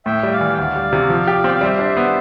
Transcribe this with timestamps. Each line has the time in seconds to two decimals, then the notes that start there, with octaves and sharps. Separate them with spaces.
0.06 A2 E5 G5
0.23 G3
0.31 D5 F5
0.41 E3
0.54 G5
0.57 D2 D5 F5
0.76 G3
0.93 C3
1.10 F3
1.27 G4
1.44 C4 G5
1.55 F5
1.61 G3 C5 E5
1.79 D4
1.97 B3